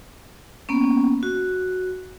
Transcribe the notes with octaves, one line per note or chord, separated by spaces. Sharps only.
A#3 B3 C#4
F#4